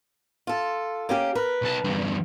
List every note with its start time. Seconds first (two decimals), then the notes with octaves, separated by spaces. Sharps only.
0.47 F4 A4
1.09 A#3 C#4 G4
1.35 A#4 B4
1.62 B1 A5
1.84 E2 G2